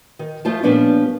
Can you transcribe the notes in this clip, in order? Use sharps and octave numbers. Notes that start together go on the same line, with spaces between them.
D#3
F3 A3 F4 C5 A5
A#2 F3 G3 B3 C#4 D4